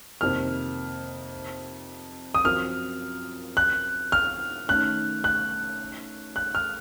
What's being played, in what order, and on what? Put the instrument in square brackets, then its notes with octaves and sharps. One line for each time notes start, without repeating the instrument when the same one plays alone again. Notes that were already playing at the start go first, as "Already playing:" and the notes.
[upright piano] F2 C3 D#3 A#3 [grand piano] F6
[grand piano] D#6
[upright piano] F#2 F3 C4 F4 A#4 [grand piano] F6
[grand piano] F#6
F6
[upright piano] D#3 A3 C#4 [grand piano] F#6
[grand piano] F#6
F#6
F6